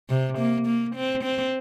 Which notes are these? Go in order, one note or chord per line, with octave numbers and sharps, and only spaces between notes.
C3
A#3
A#3
C4
C4